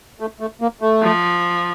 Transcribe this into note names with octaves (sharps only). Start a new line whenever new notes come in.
A3
A3
A#3
A3
F3